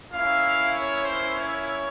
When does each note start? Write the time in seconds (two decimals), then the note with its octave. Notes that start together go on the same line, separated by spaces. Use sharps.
0.12 A#3 C#4 E4 F5
0.73 C#5
1.03 C5
1.33 C#5